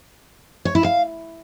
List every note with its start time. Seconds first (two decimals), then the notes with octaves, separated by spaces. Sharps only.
0.65 C#5
0.75 E4
0.84 F5